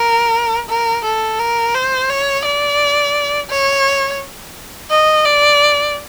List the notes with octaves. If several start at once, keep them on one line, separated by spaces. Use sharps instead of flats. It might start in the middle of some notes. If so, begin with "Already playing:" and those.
Already playing: A#4
A#4
A4
A#4
C5
C#5
D5
C#5
D#5
D5